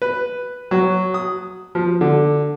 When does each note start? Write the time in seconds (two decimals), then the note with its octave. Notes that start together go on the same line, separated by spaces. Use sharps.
0.02 B4
0.71 F#3
1.14 D#6
1.75 F3
2.01 D3